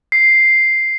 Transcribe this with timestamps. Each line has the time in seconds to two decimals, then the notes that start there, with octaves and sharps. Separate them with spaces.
0.12 C7